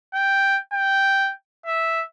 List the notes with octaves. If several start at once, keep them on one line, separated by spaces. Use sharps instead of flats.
G5
G5
E5